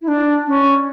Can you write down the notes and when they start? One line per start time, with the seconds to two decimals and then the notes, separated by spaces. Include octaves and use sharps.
0.01 E4
0.07 D4
0.46 C#4